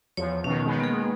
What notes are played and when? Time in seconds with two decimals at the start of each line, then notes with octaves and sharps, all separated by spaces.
0.17 E2 F3 C#5
0.44 B2 D#3 C#4
0.65 D#3 G#3 B3
0.80 A#3 G#4